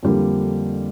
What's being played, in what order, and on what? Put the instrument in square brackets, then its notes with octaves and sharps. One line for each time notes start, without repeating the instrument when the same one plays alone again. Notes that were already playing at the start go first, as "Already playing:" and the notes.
[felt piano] F2 D3 G3 A#3 D4